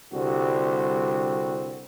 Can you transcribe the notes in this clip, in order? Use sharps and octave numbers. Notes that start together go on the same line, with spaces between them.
C2 D3 G3 C4 F#4